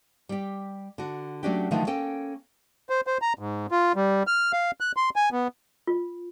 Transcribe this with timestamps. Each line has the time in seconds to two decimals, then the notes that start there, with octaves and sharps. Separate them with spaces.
0.29 G3 G4
0.98 D3 F#4
1.43 F#3 A3 C#4 D4 F#4 G4
1.71 D3 D#3 F3 F#3 A3 D#4
1.87 A#3 C#4 A4 G5
2.89 C5
3.07 C5
3.22 A#5
3.39 G#2
3.71 F4
3.96 G3
4.27 F6
4.53 F5
4.80 F#6
4.97 C6
5.16 G#5
5.32 B3
5.87 F4